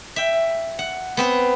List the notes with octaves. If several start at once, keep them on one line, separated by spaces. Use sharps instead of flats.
E5 G5
F#5
B3 C4 B4